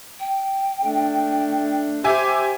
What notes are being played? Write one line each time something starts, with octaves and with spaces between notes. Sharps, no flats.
G5
A3 D4
G4 C5 E5 G#5 D6